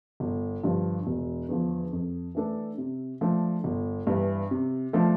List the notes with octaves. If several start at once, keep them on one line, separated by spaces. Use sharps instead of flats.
G1
G2 D3 F3
E1
E2 D3 F3
F2
E3 A3 D4 A4
C3
F3 A3 D4
G1
G2 E3
C3
F3 A3 D4